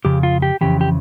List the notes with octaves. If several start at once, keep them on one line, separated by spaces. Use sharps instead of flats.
F2 C#3 G4
F4
G4
F2 C#3 E3 G4
G4